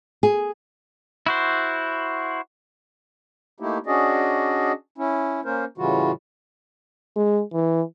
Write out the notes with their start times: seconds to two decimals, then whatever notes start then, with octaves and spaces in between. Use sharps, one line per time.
0.23 G#4
1.26 E4 F#4 C5
3.60 A3 A#3 D#4 E4 G4
3.86 C#4 D4 F#4 G#4 D5 D#5
4.98 C#4 E4
5.45 A#3 C#4 A#4 C5
5.78 A2 C#3 E3 G3 F4 F#4
7.16 G#3
7.53 E3